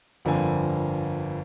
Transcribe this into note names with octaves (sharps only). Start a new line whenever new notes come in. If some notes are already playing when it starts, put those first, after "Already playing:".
G1 F2 D3 A#3 G#5